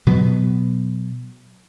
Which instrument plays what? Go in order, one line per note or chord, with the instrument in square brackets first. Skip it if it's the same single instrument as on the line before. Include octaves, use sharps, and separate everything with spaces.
[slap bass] B2 F#3 B3